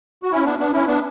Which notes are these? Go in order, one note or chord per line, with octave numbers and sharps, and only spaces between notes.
F#4
C#4 E4
B3 D4
B3 D4
C#4 E4
B3 D4